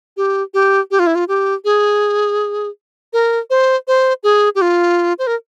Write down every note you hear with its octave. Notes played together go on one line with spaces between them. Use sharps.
G4
G4
G4
F4
E4
F4
G4
G#4
A#4
C5
C5
G#4
G4
F4
C5
A#4